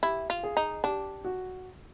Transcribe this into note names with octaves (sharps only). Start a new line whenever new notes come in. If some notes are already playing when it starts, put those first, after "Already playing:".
E4 G4
F4
G#4
D#4
D4 G4
F#4